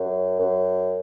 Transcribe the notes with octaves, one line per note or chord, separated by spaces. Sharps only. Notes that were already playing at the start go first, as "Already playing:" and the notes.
Already playing: F#2
F#2